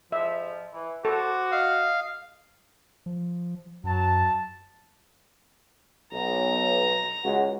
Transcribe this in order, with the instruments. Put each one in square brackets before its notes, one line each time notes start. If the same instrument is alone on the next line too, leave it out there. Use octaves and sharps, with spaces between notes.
[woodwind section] F2 G#2 F3 [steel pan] E5
[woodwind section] E3
[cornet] F#4 [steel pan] A4 [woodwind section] C5 C#6 D6
[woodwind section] D#5 [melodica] F5
[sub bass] F3
[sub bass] F#2 [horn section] F#3 A5
[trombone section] B1 [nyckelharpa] A#5
[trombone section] C#2 F#4